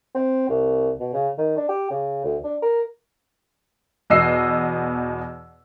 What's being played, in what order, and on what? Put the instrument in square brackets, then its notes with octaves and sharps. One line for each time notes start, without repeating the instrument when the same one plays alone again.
[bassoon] C4
C2
B2
C#3
D#3
D4
G4
C#3
D2
D4
A#4
[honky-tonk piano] E2 B2 D#5 E6 C7